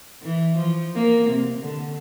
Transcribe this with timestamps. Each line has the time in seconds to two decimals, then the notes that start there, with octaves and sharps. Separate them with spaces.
0.22 E3
0.57 F3
0.95 A#3
1.30 C3
1.62 D3